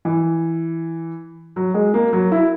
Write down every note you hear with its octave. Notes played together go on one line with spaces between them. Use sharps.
E3
F#3
G#3
A#3
F#3
E4